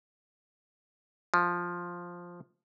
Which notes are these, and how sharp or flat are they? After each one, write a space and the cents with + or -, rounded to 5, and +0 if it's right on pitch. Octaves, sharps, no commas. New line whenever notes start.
F3 +5